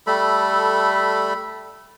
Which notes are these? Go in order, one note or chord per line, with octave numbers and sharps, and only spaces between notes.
G3 A3 A4 B5